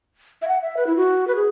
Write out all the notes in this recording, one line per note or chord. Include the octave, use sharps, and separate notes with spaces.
E5
F#5
E5
B4
E4
F#4
B4
G#4